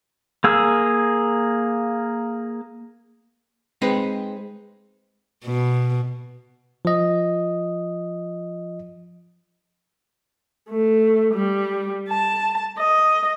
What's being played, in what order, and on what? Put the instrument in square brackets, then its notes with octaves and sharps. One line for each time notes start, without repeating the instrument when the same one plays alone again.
[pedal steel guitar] A#3 G#4 E6
[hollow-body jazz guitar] G#3 C4 D#4 B4
[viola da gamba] B2
[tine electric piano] F3 D#5
[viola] A3
G3
A5
D#5